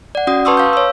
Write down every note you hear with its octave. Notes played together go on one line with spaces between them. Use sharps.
D5 F#5
C#4 F#4 F#5 D#6
B4 A5 C6 C#6 D#6 E6
F5 G6
C#5 E6